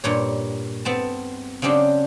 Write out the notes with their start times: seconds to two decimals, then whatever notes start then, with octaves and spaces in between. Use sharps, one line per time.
0.04 G2 A#2 C#5
0.85 B3 C4 A5
1.62 C#3 F#3 C4 D4 G4